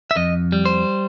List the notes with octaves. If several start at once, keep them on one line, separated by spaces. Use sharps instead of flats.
E5
F2 D#5
G3
C5